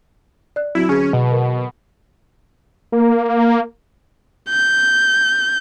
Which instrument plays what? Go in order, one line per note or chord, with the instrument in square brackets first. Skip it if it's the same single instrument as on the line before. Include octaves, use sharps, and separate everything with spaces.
[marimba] D5 F#6
[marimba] F#3 C4 F#4 [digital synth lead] E4
[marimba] D3 G#4 [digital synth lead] C#4
[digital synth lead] B2
[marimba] A#4
[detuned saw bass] A#3
[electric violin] G6